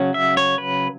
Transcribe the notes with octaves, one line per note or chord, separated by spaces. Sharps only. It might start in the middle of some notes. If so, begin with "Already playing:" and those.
Already playing: C#3 F#3 C#4
E5
C#5
B4